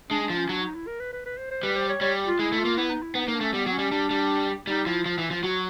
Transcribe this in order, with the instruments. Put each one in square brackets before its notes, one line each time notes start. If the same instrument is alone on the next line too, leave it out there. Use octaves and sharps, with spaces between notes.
[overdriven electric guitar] G#3 [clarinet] D4
[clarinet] D4
[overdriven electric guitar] F3
[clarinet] C#4
[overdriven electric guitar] F#3 [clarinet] D4
[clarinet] D#4
E4
A#4
B4
B4
B4
C5
C5
[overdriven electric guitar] G3 [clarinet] B4
[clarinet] C5
C#5
[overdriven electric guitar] G3 [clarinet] C#5
[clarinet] F4
[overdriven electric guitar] G#3 [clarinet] E4
[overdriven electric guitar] A3
[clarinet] F4
[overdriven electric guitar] A#3
[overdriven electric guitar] B3 [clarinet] E4
[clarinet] D#4
E4
[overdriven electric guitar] B3 [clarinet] D#4
[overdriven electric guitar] A#3 [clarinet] D#4
[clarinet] D4
[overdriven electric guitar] A3 [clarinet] C#4
[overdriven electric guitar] G3 [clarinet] B3
[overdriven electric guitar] F#3
[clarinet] C#4
[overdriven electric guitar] G3
[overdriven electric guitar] G3 [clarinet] D4
[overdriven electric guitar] G3
[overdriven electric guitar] G3 [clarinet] D#4
[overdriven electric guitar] F3 [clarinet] E4
[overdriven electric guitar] F3 [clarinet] F4
[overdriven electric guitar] E3 [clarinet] E4
[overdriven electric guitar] F3 [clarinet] F4
[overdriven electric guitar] F#3 [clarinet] F#4